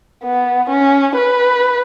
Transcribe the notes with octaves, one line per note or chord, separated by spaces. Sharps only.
B3
C#4
B4